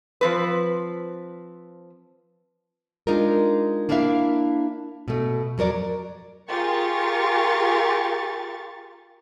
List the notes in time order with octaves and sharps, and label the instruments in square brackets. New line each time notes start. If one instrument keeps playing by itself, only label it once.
[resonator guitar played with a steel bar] F3 C4 B4
[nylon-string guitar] G#3 D4 D#4 F4 A#4
A#3 D4 E4 A#4 E5 F5
B2 A3
F2 F#3 A#4 D5
[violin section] F4 G4 G#4 A#4 C#6 A6